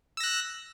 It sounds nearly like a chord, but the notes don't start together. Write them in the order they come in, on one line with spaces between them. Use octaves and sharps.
E6 A#6 F#6